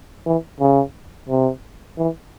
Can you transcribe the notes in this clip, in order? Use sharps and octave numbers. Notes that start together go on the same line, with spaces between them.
E3
C#3
C3
E3